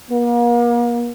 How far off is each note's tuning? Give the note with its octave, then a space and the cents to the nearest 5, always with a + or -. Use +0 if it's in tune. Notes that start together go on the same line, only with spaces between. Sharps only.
A#3 +40